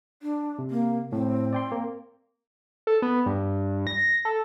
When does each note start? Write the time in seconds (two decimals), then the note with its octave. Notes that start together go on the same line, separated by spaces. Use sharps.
0.23 D4
0.59 C3
0.70 A#3
1.12 A2 C4
1.53 D5 G5 C6
1.72 A#3
2.87 A4
3.02 B3
3.26 G2
3.87 A#6
4.25 A4